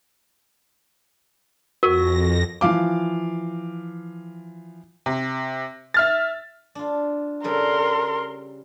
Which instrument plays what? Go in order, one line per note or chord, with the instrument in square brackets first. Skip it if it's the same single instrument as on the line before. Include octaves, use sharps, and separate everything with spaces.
[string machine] F2 A#6 [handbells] F#4 [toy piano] A#4
[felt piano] E3 F3 F5 D6
[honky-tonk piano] C3
E5 F6 A6
[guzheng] D4 F4
[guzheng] C#3 G3 A4 [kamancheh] A#4 C6